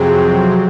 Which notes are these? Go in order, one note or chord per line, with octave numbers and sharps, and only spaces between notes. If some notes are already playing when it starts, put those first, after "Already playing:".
Already playing: F2 C3 F#3 C4 G#4